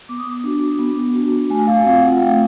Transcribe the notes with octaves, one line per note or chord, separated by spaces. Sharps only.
B3 D6
D#6
D6
D4 F#4
B3
D4 F#4
A3 G#5
F5
C4 F4 F5
F#5
A3 G5